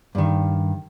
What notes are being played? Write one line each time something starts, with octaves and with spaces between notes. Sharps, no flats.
G2 D#3